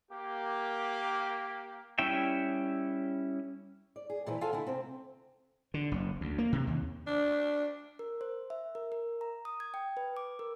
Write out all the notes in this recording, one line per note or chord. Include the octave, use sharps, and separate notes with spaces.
A#3 G4
G3 C#4 E4 E5 G5
D5
G#4
A#2 E3 F3 E4 B4
B3 F4 A4 F5 G#5 A5
D3 A#3 E4
C3 C4
D3
F#1
D2
A#3
C3
D#2
D4
A#4
C5
E5
A#4
A#4
A#5
D#6
G#6
G5
B4
D6
A#4